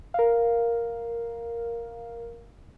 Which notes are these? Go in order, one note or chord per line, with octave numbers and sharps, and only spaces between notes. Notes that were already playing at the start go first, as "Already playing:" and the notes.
A#4 F5